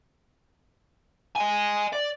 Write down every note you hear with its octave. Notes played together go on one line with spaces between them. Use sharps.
D#5 G#5
D5